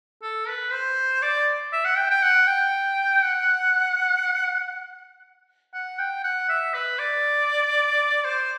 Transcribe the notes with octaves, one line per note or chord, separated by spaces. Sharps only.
A4
B4
C5
D5
E5
F#5
G5
G5
F#5
G5
F#5
F#5
G5
F#5
E5
B4
D5
C5